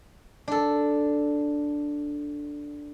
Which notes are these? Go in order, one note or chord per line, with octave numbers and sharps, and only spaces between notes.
D4 A4